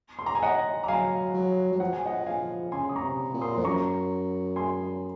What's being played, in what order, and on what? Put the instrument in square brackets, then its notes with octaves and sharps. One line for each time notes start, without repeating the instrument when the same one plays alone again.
[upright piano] C6
A#5
G#5
D#5 F#5
A#5
[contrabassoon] F#3 [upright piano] F5 G#5
[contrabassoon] F#3
F#3
[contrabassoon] F3 [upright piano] F#5
[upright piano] G#5
D#5 F#5
F5 G#5
[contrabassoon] C#3 [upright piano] G#5 C6
[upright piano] D#6
A#5 C#6
[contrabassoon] C3
A#2
[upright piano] C6 D#6
[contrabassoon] F2
[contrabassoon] F#2 [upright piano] A#5 C#6
[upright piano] G#5 C6